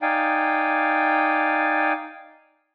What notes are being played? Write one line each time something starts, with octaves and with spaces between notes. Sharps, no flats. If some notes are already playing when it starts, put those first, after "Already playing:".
D#4 D5 F5 G5 G#5